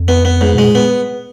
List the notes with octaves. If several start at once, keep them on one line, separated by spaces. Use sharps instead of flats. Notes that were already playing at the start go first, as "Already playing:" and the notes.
Already playing: F2
B3
B3
G#2
B2 G#3
A#2
B3